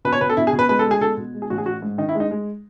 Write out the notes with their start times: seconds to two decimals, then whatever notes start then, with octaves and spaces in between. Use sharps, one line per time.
0.05 B2 B4
0.13 C#5
0.21 B2 B4
0.29 A4
0.37 B2 E4
0.47 G#4
0.53 B2
0.59 B4
0.69 G#3 B4
0.79 A4
0.85 G#3
0.91 G#4
1.01 B2 A4
1.17 B2
1.34 G#3
1.42 G#4
1.50 A1 F#4
1.58 G#4
1.66 A1 F#4
1.82 G#2
1.98 D#3 D#4
2.09 E4
2.15 G#3
2.20 D#4
2.31 G#3